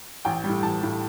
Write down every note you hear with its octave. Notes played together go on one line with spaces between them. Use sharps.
A1 G5
G3
A2
A1 A5
A2 G3